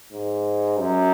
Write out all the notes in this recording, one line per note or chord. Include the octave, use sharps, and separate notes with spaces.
G#2
F#2